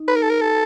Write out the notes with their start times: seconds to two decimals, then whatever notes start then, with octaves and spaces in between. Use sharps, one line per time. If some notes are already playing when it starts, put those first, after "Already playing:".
Already playing: D#4
0.08 B4
0.16 A#4
0.23 A4
0.30 A#4
0.42 A4